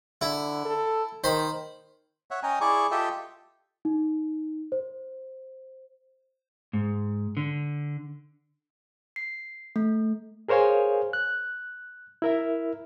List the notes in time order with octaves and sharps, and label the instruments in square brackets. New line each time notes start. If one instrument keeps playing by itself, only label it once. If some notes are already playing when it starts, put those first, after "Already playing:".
[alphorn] D3 [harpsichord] E4
[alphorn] A4
[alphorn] D#3 [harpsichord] C5 B5
[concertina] C#5 E5 F#5
C#4 D#5 G5 G#5 A#5
E4 G#4 D5 C#6 D6
F4 G4 A4 D#5 E5 G5
[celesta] D#4
C5
[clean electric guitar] G#2
D3
[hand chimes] C7
A3
[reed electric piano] G#4 A#4 C5 C#5 F5 G#5
F#6
E4 A#4 E5